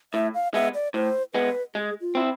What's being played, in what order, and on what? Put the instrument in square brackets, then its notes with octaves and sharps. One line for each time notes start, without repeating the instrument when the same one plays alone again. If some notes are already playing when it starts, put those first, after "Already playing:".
[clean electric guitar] A2 [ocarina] E5
[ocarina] F5
[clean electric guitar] G#3 B3 [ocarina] E5
[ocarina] D5
[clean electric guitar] A2 [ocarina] C5
[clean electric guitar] G#3 B3 [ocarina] B4
[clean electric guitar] G#3 [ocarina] G#4
[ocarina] F4
[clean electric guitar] C4 E4